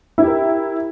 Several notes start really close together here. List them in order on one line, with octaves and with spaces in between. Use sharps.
E4 G4 A#4